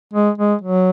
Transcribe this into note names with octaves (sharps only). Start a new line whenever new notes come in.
G#3
G#3
F#3